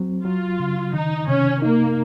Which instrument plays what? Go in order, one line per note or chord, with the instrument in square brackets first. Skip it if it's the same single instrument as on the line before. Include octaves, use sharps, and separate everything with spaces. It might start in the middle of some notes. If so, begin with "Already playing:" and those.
Already playing: [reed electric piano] F#3 C4
[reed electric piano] F#3 [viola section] F4
[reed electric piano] C#3
[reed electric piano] D#3 [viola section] D#4
[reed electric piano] C3 [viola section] C#4
[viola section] A#3 [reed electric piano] D#4